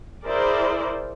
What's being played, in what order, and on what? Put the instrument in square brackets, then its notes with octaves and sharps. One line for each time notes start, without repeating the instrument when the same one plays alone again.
[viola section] E4 G#4 A#4 C5 D5